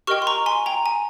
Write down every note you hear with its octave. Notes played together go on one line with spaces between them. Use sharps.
G4 A#4 D#5 G5 C#6 F6
C6
A#5 C#6
G#5 C6
G5 A#5
G#5